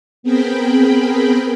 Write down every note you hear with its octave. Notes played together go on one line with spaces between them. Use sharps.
B3 C4 G#4 A#4 G5 B5